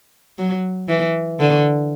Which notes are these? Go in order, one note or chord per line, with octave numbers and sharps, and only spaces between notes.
F#3
E3
D3